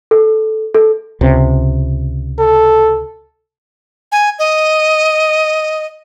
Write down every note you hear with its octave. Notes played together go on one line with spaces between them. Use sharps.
A4
A4
C#2 C3
A4
G#5
D#5